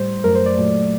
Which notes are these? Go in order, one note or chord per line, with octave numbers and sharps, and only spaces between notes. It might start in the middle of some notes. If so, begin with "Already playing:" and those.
Already playing: A2 G3 C5
F#2 F#3 A3 A#4
C5
D5
A#2 F#3 A3